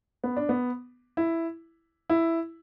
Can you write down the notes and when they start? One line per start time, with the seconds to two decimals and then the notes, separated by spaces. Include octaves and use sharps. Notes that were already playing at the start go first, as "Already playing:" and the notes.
0.24 B3
0.37 D4
0.49 B3
1.17 E4
2.10 E4